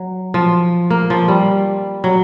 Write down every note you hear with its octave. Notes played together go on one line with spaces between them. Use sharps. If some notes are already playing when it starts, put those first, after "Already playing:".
Already playing: F#3
F3
A#3
F3
G3
F#3